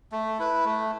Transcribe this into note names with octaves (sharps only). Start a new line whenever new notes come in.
A3
E4 B4
A3